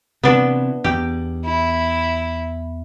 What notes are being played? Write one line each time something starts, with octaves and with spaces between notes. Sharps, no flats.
C3 E3 B3 D4
E2 G4
E4